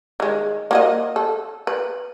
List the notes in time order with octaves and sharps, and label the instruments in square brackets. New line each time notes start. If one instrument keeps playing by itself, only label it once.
[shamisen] D#3 G#3
A#3 F#4 D#5
A4
B4